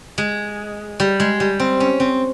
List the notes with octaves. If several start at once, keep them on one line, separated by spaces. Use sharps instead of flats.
G#3
G3
G#3
G3
C4
C#4
C4